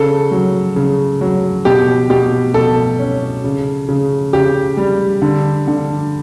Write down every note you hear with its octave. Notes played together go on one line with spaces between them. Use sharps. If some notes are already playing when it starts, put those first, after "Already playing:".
Already playing: C#3 A4
F#3
C#3
F#3
B2 G4
B2 G4
B2 A4
C#4
C#3
C#3
C#3 G4
G3
D3
D3